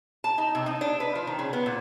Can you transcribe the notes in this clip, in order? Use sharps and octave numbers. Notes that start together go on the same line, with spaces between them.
A5
D#4
C3
D#4
D4
B4
F3
D#3
C#3
B3
A#2